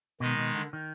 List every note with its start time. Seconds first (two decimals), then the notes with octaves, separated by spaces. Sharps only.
0.20 B2 D#3 G#3 D#4
0.38 B2
0.55 D3
0.73 D#3